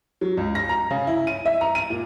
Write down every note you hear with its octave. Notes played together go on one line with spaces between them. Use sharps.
F#3
C#2
A#6
A#5
C#3
E4
D#7
E5
A#5
D#7
A#2